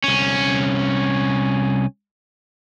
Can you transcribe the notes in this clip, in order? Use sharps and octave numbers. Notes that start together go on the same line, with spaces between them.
C2 C#4